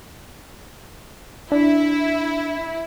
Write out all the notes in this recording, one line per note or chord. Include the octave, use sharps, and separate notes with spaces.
D4 E4